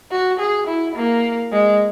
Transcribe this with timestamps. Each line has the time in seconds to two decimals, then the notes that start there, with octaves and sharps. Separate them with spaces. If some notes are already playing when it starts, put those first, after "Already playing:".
0.11 F#4
0.40 G#4
0.67 E4
0.96 A#3
1.52 G#3